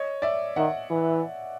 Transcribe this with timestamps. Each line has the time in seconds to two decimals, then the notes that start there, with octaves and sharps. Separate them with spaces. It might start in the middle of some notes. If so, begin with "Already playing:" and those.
Already playing: C#5 D#5
0.22 D5 E5
0.56 D#3 E5 F#5
0.90 E3